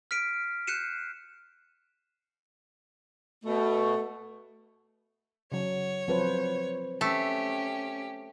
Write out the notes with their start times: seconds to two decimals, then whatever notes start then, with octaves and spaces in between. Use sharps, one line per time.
0.11 F6 B6 C7 D7 D#7
0.67 F#6 G6 C7 C#7 D#7 E7
3.45 B2 A3
5.52 C#3 F#3 C#5
6.08 F3 F#3 C4 B4 C5
7.01 A3 C#4 G4